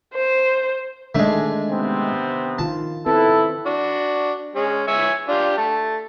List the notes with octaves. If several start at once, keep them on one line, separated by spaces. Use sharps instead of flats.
C5
D#3 G#3 A3 D4
C3 B3 C4
D#3 F4 A5
C4 E4 A4 B4
D4 F#4
G#3 C#4 G#4
C#5 E5 G#5
D4 F4 G4
A3 A5